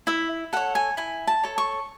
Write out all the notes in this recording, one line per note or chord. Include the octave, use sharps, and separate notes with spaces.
E4 E5
A4 C#5 F#5
G#5
E4 G#5
A5
A4 C#5
C#6